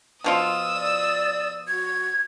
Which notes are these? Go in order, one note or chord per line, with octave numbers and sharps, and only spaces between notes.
B2 F3 F4 D#6 E6
D5
F#4 G#6